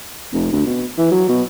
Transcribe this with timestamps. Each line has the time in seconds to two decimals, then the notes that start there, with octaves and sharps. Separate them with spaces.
0.33 F1
0.52 D2
0.66 B2
0.98 E3
1.11 F#3
1.29 B2